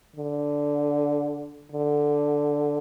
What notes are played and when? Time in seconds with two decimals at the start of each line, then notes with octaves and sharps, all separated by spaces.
0.16 D3
1.72 D3